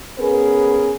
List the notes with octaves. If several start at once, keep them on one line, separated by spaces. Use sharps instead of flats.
B3 C#4 G#4 A#4 B4